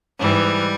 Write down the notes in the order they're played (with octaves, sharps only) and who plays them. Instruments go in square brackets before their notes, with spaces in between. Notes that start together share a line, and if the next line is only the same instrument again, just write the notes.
[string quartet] G#2 E3 G3